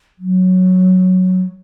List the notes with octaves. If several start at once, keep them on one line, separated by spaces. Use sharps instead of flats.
F#3